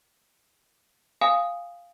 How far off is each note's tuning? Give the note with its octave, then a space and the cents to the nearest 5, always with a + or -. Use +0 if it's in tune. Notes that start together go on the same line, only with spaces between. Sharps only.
F5 +0 G#5 -15 D#6 +0